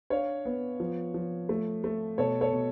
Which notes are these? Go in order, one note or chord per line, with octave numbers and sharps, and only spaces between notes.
D4 C#5 F5
B3
F3
F3
A3
A3
B2 A4 C#5
A4 C#5
B2